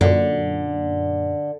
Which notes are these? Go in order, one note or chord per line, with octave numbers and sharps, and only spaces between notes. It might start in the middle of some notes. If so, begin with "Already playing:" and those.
F#2 A#2 D3